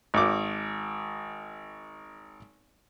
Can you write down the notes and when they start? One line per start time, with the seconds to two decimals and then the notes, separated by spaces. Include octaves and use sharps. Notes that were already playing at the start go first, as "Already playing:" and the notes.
0.14 G#1 D6